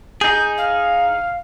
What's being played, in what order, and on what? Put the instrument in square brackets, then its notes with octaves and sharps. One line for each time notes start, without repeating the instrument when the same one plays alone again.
[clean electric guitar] D#4 G#4 [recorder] G6
[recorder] F5